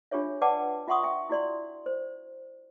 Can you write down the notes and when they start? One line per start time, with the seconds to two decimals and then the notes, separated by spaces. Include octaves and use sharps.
0.11 D4 F4 G4 G#4 C#5 E5
0.41 B4 D5 F#5 G5 A5 D6
0.88 F4 E5 F#5 C6 C#6 D#6
1.03 E5 G5
1.29 E4 F#4 D5 C6
1.86 C5